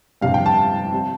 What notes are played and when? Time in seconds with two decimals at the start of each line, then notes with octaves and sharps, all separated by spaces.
0.21 G1 F2 C3 G3 C4 F5
0.34 G5
0.46 A5
0.93 G3 C4